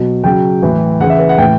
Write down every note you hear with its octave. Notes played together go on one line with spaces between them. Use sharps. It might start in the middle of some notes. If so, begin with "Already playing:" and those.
Already playing: B2 F#3
C#3 F#3 G5
A2 E3
C#3 E3 F#5
E5
B4
F#5
A2 E3 G5